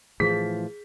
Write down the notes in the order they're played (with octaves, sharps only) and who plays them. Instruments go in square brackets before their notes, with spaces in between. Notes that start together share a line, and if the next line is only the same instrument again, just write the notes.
[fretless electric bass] A2 E3 F3 [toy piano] G#4 [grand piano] B6